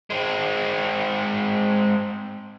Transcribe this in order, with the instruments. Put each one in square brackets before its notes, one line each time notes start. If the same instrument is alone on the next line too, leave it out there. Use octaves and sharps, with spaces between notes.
[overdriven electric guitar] G#3 C4